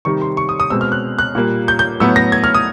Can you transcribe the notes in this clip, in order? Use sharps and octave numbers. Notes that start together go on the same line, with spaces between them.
C3 D#3 G3 C#6
C6
C#6
D#6
D#6
B2 G#3 C4 E6
F6
F#6
F#6
A#2 G3 A#3
G6
G6
A2 F#3 B3 E6
A#6
G#6
F6
D#6